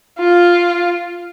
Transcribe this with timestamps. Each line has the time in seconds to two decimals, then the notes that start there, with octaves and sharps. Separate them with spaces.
0.19 F4